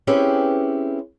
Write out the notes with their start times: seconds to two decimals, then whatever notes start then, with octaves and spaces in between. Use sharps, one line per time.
0.07 C4 C#4 E4 G4 G#4 B4